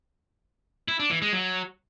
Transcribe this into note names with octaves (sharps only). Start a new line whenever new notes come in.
E4
D4
E3
G#3
F#3